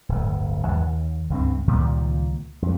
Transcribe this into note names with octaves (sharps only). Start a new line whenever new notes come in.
D1 G1
D#2
C#2 G2 C4
C#2 A#2 D#3 G3
F2